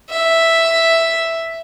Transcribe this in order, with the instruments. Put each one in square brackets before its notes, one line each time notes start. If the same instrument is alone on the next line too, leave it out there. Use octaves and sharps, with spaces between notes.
[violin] E5